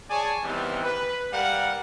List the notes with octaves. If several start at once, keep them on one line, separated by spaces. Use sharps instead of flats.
G#4 C#5 D5 G#5 A5
D#3 E3 G3 B3 C4
B4
G3 A#4 F5 F#5